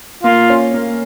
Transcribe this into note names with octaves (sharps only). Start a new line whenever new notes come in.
A#3 F4
C#4
A#3